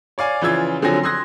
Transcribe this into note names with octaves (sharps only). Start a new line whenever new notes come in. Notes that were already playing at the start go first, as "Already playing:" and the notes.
C#5 D5 F5 G#5
C#3 E3 F3 F4 E6 G#6
D3 F3 F#3 C4 G#5 A#6
C6 D#6 E6 F#6 G#6 A#6